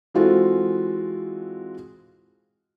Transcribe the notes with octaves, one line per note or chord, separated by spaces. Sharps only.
E3 G#3 C4 F4 F#4 A4